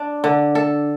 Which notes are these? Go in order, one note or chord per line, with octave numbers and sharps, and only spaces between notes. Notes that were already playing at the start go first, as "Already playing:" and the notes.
Already playing: D4
D3
A4